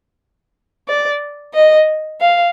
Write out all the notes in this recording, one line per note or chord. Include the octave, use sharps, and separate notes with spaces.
D5
D#5
F5